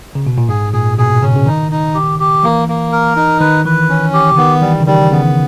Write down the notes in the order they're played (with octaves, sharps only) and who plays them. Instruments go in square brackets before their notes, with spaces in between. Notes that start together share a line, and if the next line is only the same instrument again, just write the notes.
[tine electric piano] C#3
B2
A#2
[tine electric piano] G#2 [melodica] G#4
[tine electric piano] A#2 [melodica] G#4
[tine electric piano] B2 [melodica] G#4
[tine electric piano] C#3 [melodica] C#4
[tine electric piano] C#3
[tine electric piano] D#3 [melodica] D#4
[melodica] D#4
G4
G4
[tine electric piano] E3 [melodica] A#3
[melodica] A#3
A#4
D#4
[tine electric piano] D#3 [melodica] B4
[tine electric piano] E3 [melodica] B4
[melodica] C#4
G4
[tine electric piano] C#3
[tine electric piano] D#3 [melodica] B3
[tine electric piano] E3 [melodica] G3
[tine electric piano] C#3
[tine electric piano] D#3 [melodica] G3
[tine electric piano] C#3 [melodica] B3